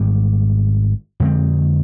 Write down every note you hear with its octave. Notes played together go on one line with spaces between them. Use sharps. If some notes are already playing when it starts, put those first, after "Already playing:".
Already playing: G#1 G#2 D#3 G3
F2 D3 G#3 C4